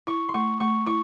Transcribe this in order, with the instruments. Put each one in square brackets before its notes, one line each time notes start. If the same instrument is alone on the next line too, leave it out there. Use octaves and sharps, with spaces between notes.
[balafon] E4 [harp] C#6
[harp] C6
[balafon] A3 [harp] C#6
[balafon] A3 [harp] C#6
[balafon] E4 [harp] C#6